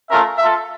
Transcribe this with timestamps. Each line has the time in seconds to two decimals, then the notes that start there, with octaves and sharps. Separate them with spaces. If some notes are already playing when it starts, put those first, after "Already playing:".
0.10 A3 C#4 F4 A#4 E5
0.38 F4 A4 E5